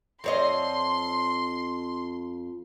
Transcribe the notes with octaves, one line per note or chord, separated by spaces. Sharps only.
F2 C#5 D#5 C6